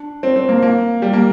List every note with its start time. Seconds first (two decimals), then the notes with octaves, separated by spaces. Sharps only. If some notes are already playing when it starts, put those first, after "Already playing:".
Already playing: D4
0.23 C4
0.36 C4
0.49 A#3
0.62 A#3
1.02 G3
1.13 A#3